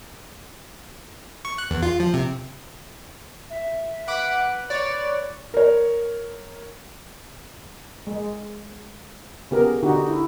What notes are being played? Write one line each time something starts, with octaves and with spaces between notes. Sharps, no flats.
C#6
F#6
E2
F4
F3
C3
E5
B4 F#5 D6 B6
C#5 D5 A6
A#4 C#5
G#3
C#3 B3 G4 G#4 A#4
D3 D#4 F#4 G4
E4